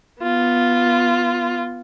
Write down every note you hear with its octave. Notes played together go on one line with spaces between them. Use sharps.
B3 F4